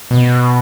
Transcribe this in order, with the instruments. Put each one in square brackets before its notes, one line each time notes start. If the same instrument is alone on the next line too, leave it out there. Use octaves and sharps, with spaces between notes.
[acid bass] B2